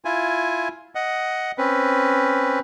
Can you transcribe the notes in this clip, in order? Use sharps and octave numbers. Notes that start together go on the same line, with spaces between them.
E4 F4 G#5
D#5 F#5
C4 C#4 B4